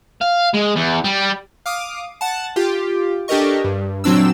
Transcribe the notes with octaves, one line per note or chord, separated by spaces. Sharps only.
F5
G#3
E2
G3
F5 D6 D#6
F#5 A5
F4 G4
D4 G4 A4 A#4 D#5 C#6
G2
A#2 F#3 C4 D4 E6